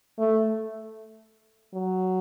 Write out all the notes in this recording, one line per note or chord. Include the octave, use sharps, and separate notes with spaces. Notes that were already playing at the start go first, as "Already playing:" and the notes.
A3
F#3